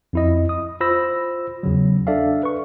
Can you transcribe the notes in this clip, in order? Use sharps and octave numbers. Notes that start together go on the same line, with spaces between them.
F2 E4 D#5
D#6
F4 C5 B5 E6 A#6
E2 C#3 F#3
D4 A4 D5 E5 F5
B4 C#6